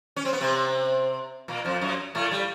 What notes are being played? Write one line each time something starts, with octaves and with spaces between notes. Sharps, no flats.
C#4
C4
B3
C3 C4
A#2 A#3
F2 F3
F#2 F#3
A2 A3
G3